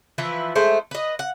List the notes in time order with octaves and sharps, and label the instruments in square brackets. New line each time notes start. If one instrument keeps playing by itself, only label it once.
[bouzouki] E3 F3 E4 B4
G#3 A3 E4 C5
B4 D#5
F#5